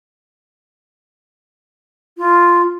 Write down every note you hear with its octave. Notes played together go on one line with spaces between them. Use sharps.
F4